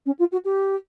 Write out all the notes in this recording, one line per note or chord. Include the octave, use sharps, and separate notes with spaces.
C#4
F4
F#4
G4